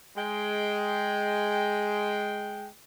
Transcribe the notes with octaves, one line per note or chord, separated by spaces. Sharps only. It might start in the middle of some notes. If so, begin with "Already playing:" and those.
G#3 G5